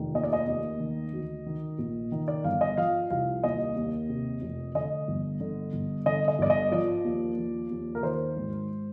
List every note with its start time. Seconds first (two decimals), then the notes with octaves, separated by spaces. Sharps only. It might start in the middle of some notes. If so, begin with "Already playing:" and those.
Already playing: F1 D#3
0.14 D#2 D#5
0.23 D5
0.33 D#5
0.47 D#2
0.80 D#3
1.13 D2
1.46 D#3
1.78 A#1
2.12 D#3
2.28 D5
2.44 G1 F5
2.61 D#5
2.77 F3 F5
3.10 C2 F5
3.43 D#2 D#5
3.76 D#2
4.09 C3
4.42 F1
4.75 D3 D#5
5.08 G1
5.41 D3
5.73 G1
6.06 D3 D#5
6.28 D#5
6.39 G1 D5
6.50 D#5
6.71 F3 D5
7.04 D#2
7.37 F3
7.70 D#2
7.95 A#4
8.03 D#3 C5
8.37 G#1